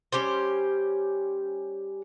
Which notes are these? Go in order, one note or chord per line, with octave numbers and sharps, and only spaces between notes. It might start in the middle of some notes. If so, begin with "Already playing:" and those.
G3 C#4 G4 C5